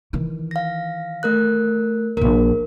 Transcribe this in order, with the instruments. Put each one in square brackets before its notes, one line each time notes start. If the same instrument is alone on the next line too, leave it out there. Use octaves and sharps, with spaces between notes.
[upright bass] D#3 E3
[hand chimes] F5 A#6
A3 A#4 F#6
[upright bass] D1 A#1 [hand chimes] A#4